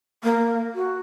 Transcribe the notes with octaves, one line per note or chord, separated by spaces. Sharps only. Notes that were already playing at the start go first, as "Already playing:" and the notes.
A#3
F#4